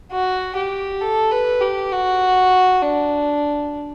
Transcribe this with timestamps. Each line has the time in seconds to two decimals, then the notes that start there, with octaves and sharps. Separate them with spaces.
0.12 F#4
0.56 G4
1.01 A4
1.31 B4
1.61 G4
1.92 F#4
2.82 D4